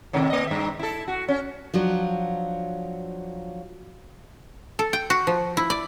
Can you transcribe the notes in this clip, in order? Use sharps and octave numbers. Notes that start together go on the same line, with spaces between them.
A2 C3 D#3
A#3 D#5
G2 E5
E4 A4
F#4
C#4
F3 F#3 D4 F#4
A4
G5
F#4
F3
E4
D5